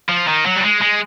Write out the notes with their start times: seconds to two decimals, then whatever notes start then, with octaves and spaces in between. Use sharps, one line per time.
0.09 F3
0.28 D#3
0.46 F#3
0.56 G3
0.64 G#3
0.81 G#3